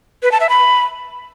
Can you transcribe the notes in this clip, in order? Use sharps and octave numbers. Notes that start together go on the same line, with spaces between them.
B4
A5
E5
B5